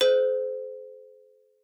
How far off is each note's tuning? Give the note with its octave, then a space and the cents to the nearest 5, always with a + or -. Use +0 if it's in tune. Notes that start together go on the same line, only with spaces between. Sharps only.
G#4 +45 C5 -25